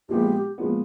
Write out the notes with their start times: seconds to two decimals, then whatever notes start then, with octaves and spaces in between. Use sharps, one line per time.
0.09 A#1 A#2 F3 G#3 B3 G4
0.58 A#2 F3 G#3 B3